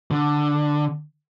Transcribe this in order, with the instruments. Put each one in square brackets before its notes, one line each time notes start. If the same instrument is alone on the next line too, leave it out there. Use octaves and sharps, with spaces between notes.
[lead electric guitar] D3